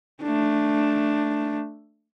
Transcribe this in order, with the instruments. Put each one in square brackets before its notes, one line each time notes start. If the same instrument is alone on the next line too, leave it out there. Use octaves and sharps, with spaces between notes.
[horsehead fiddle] A3 D4